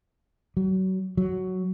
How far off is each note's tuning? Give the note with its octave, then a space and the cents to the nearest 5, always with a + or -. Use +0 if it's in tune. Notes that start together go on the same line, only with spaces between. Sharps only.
F#3 +30
F#3 +5